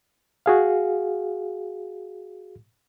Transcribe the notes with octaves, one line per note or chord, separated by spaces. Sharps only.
F#4 G#4 F5